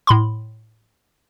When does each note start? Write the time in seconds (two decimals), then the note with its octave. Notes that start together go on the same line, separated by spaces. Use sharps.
0.07 A2 B5 C6